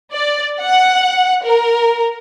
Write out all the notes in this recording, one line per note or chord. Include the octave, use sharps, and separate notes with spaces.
D5
F#5
A#4